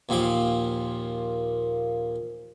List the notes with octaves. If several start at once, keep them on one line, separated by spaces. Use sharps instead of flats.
D#2 A#2 F3 D6